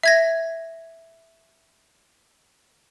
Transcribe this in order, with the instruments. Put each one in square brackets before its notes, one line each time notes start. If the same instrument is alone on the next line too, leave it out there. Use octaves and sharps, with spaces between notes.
[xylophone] E5 G#6 A#6